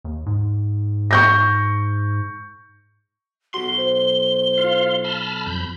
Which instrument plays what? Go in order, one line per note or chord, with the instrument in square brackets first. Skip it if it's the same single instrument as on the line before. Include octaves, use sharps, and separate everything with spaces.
[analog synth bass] D#2
G#2
[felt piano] C#6 G6 A#6
[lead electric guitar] B1 C6 [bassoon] F#4 [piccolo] G7
[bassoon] C5
[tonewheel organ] F4 F5
A5 B5 F6
F2 B5 G6